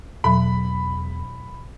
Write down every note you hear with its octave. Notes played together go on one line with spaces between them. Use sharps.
E2 B2 F#3 B5